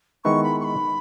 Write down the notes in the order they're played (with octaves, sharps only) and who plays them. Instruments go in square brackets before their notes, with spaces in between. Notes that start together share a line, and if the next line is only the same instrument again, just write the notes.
[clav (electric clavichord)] D#3 G#3 B3 E4 B4 [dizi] C#6
[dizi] B5
C#6
B5